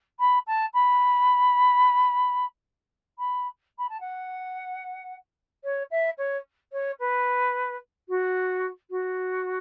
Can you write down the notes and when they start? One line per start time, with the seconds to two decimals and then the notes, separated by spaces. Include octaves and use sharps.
0.19 B5
0.47 A5
0.74 B5
3.18 B5
3.78 B5
3.89 A5
4.00 F#5
5.64 C#5
5.91 E5
6.18 C#5
6.72 C#5
6.99 B4
8.08 F#4
8.90 F#4